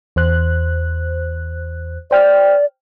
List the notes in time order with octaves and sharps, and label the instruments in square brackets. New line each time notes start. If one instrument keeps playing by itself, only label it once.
[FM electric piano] E2 C5 F#6
[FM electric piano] C5 G5 F6 [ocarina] D5